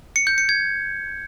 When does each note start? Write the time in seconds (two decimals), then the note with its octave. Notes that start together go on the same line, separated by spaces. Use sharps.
0.16 C#7
0.27 G6
0.38 C#7
0.49 G#6